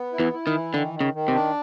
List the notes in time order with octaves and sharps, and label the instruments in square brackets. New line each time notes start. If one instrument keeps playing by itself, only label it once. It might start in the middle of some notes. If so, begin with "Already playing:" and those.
Already playing: [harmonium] B3
E4
[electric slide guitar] E2 E3
[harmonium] E4
[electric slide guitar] D#3
[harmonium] E3
[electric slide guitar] D3 [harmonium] D#3
[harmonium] D#3
[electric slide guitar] C#3
[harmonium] D#3
[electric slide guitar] C3
[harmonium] D4